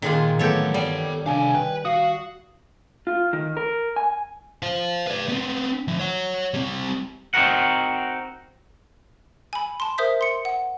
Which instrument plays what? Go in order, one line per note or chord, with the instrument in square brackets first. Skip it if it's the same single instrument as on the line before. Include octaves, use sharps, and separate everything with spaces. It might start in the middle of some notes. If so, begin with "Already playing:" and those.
[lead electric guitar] A#2 [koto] D#3 G#3 F4
[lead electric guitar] A2 F#3 [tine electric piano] E3 B3 G6 [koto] G4 A4 C#5
[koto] G3 [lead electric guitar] A4 G5
[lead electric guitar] C3 F5 [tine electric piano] D4 [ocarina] G#5
[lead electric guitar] B4 [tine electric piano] G5
[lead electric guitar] F#4 [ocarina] F5 [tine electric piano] D#6
[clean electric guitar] F4
D#3
A#4
G#5
[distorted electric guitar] C5 F5
B4 D5
B3 C4
F3 E5
C#5 F#5
G3 C4
[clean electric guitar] C4 D#4 F#4 A#4 F#5
[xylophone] G#5 B5
A5 C6
A#4 C5 E5 D#6 G6 B6
C6 C#7
F#5